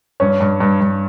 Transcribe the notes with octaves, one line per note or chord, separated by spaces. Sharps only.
G2 C#4 C#5
G2
G2
G2